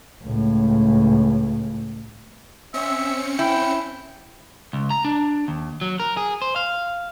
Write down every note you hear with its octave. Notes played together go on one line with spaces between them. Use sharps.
C#2 A2
C4 C#4 E5 C#7
E4 G5
C#2
A#5
D4
D#2
F#3
A#4
G#4
C5
F5